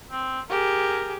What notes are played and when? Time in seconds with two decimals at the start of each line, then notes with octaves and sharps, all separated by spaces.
0.11 C4
0.50 G4 G#4 A#4